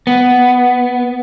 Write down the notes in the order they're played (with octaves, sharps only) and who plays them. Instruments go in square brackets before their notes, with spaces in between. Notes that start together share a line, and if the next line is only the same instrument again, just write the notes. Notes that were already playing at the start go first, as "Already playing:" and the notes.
[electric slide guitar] B3